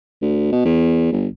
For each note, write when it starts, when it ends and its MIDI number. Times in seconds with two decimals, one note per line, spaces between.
0.22 0.51 38
0.52 0.60 47
0.65 1.08 40
1.12 1.26 31